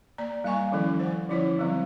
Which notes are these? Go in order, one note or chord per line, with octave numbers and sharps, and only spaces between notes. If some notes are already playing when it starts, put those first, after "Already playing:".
A#3 D5 A#5
G3 A#3 D#5 G#5 C#6
D#3 F3 C#4 E4 A4
C5 F#5
D3 F3 C#4 E4 F4 C#5
D3 F#3 G3 C4